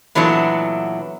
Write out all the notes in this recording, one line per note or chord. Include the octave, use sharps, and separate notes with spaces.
A#2 E3 F#3 A3 B3 D4